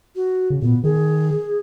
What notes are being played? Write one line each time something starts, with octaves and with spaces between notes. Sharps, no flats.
F#4
C#3
A#2 B3
D#3 G#4